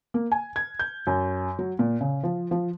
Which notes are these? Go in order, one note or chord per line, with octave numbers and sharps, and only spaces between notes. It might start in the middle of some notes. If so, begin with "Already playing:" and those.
A#3
G#5
G#6
G6
F#2
F#3
A#2
C#3
F3
F3